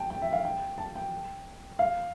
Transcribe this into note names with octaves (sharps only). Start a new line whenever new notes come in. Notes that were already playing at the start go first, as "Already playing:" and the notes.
Already playing: G5 A5
G5
E5
F5
G5
A5
G5
F5